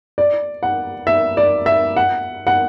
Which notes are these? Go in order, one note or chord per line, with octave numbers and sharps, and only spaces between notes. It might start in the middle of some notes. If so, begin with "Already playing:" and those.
D5
F#5
E5
D5
E5
F#5
F#5